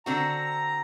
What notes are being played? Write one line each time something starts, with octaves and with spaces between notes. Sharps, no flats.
D3 C4 F#4 A#5